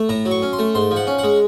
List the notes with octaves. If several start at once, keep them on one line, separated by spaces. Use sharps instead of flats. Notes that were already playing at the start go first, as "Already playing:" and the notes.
Already playing: A3
A2 A#5
F#3
C#6
C#4
C6
A3
G#2 C6
F3
F#5
C#4
F#5
G#3